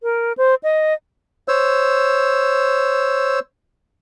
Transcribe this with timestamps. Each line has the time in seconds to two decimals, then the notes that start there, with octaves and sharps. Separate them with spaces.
0.03 A#4
0.37 C5
0.63 D#5
1.48 C5 C#5 E6